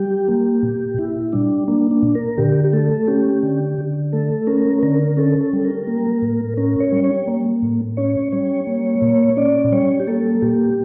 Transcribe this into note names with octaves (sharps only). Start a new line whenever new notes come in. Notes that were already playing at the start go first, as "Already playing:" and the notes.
Already playing: G3 G4
A#3
A#2
A#2 E4
G3 D4
A#3 D4
D4
A#2
A#4
D3 G4
G4
A3 A4
C#4 G4
D3
D3
A3 A4
C#4 A#4
D3 A#4
C#4 A4
A4
G3
A#4
A#3
A2
C#4 A#4
C#5
G3
C#5
A#3
A2
C#4 C#5
G3 C#5
A#3
A#2
C#4 D5
G3 C#5
G4
A#3 A4
A#2 G4